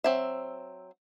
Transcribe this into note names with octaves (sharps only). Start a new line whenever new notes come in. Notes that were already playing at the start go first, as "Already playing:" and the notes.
F#3 C4 E5